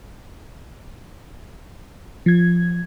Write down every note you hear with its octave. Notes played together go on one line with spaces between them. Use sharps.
F3 G#6